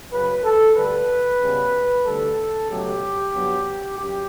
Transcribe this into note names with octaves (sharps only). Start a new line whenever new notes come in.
F#2 C#3 F#3 B4
A4
D2 D3 G3 B4
C#2 C#3 G3 B3
D2 D3 G3 A4
C#2 B2 F#3 A3 G4
G2 F#3 B3
F#2 G4